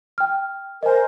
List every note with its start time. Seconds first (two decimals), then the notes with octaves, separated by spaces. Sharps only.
0.18 G5 F6
0.83 A#4 C5 D#5 G#5